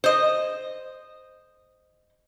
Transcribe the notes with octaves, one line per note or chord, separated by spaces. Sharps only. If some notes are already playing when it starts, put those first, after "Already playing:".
C5 D#5